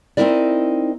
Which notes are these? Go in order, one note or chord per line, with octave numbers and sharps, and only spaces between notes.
C4 C#4 D#4 E4 A#4 D5